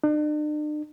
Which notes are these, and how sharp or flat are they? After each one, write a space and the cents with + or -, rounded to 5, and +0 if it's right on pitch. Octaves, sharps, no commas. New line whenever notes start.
D4 +45